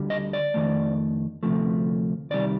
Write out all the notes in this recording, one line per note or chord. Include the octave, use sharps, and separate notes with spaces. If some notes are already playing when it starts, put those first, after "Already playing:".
Already playing: D2 D3 G3
D#5
D5
F2 D#3 A3
D2 C3 F3 A3
C2 C3 D#3 G3 D5